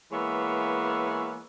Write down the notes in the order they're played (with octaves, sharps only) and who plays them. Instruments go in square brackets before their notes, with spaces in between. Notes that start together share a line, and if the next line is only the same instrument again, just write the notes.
[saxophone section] E3 G#3 A#3 B3 C#5 E5